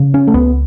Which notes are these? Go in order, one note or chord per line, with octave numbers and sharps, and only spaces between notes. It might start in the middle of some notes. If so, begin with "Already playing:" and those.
Already playing: C#3
C#4
A3
C#2 B3